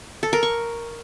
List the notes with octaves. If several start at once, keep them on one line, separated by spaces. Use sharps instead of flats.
A4
A#4
C#6